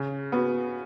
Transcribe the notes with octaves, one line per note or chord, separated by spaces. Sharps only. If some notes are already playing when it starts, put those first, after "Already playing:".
Already playing: C#3
B3 F#4